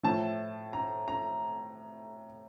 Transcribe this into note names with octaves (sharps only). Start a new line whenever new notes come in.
A2 F3 A3 A5
A#5
A#5